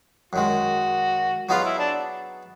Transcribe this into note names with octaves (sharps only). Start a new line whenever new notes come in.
F#2 D#3 G#3 F#4
F#3 B3 D#4 F4 G#4 B4
E4
D4